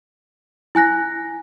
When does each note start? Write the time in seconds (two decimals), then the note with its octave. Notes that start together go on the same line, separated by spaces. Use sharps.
0.75 E4 G#5 F#6 A#6